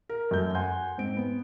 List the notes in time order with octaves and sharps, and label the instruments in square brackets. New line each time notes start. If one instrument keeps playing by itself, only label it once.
[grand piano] A#4
F#2 A3 G6
F#5 G#5 C6 G6
G#2 C4 D7
B3